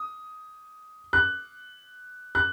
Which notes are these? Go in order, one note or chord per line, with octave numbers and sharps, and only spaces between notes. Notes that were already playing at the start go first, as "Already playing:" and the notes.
Already playing: D#6
F#6
F#6